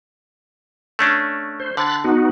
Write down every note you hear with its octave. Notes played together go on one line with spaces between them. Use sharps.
A3 C#4 D4
C5
D3 B5 F#6 A6
B3 D#4 F#4